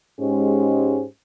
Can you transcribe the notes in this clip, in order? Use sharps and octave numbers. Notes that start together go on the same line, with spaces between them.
G#2 G#3 C#4 G4 C5